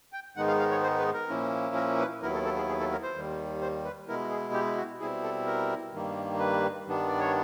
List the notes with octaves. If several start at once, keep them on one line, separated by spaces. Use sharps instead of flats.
G5
G#2 D#3 G#3 B3 D#4 F#5
F5
F5
C#5
C5
B4
A#4
A#2 F3 A#3 C#4 E4
A#4
B4
D#2 D#3 F#3 B3 E4 A#4
A4
A4
G#4
G#4
A4
A#4
C5
D#2 D#3 G3
C5
B4
B2 G#3 B3 E4 A#4
G#4
G4
F#4
B2 G3 C4 E4 G#4
A4
A#4
G2 D#3 G3 A#3
B4
G2 D#3 G3 B3 D4
D5
C#5